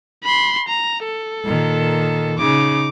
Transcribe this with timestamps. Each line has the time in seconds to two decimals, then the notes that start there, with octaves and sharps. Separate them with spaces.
0.24 B5 C6
0.68 A#5
1.05 A4
1.44 A#2 D#3
2.39 C#3 D#4 D6